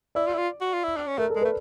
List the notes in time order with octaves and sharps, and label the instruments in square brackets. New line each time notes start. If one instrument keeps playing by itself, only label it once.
[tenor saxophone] E4 [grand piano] D5
[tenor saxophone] F4
E4
F4
F#4
F4
E4
D4
C#4
[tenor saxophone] A3 [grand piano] A#4
[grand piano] A4
[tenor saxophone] G#3
[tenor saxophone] A3 [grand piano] B4